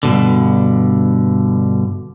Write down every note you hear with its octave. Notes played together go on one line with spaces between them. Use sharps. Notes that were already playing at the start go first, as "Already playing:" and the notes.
G2 B2 D3